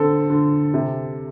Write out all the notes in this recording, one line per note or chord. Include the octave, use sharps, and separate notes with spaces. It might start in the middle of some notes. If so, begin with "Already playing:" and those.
Already playing: D3 C4 A4
D3
C3